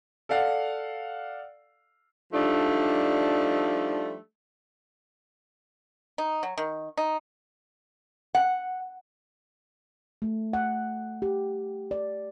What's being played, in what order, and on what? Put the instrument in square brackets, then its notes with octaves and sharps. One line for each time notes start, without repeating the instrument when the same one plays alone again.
[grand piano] A4 D5 F5 F#5
[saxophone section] F3 G3 A3 D4 D#4
[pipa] D#4
F#3
D#3
D#4
[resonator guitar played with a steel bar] F#5
[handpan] A3
F#5
G4
D5